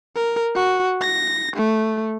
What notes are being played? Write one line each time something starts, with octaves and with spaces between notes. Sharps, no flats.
A#4
F#4
A#6
A3